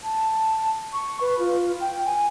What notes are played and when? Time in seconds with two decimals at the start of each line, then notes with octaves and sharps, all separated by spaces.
0.04 A5
0.93 C#6
1.21 B4
1.39 F4
1.81 G5
2.06 G#5